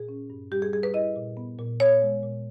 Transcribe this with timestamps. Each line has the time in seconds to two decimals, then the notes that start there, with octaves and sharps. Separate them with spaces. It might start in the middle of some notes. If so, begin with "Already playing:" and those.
Already playing: A#2 G#4
0.09 C#4
0.30 G2
0.52 G3 G4
0.62 G#4
0.73 G3 G#4
0.83 B4
0.94 E4 D#5
1.16 A#2
1.37 B3
1.59 A#2
1.80 B3 C#5
2.02 G#3
2.23 A#2